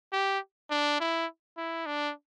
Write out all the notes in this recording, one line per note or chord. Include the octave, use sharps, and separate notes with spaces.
G4
D4
E4
E4
D4